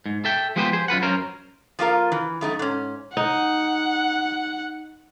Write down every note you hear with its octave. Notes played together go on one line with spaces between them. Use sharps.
G#2
A4 E5 G5
F3 G#3 B3 G4 B4 C5
G#4 C5
F#2 F4 B4 F#5
F#2 C#4 A#4 C5
F3 A#3 F4 A#4
E3
F#2 A3 D#4
G#2 C#4
D#4 F#5